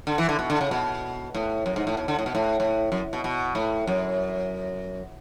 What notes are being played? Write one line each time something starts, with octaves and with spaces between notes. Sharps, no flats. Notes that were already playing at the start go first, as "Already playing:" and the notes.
D3
E3
D3
B2
D3
C#3
B2
A2
F#2
G#2
A2
B2
D3
A2
B2
A2
A2
F#2
B2
B2
A2
F#2